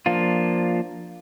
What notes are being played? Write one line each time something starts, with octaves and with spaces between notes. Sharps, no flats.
F3 A#3 D4 F4